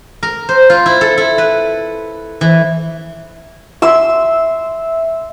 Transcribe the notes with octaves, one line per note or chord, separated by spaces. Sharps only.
A#4
C5
F4
E4
A4
E4
B4
E3
E5 C6 E6